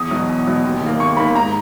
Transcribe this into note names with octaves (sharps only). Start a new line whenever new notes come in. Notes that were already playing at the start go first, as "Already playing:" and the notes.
Already playing: E2 D#6
B2 F#3
E2
B2 F#3
D#2
D#3
A#3
D#2 C#6
D#3 A#3 B5
G#2 A#5